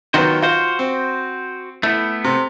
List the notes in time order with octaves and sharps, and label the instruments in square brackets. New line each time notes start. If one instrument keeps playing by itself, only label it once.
[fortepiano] D#3 F#3 B3 [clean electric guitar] F4 F#4 C5
[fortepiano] F4 [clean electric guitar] F#4 C5
[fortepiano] C4
[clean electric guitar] A3 B3 [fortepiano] E4
[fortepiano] C3